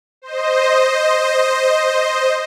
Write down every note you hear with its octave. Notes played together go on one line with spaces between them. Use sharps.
C5 D#5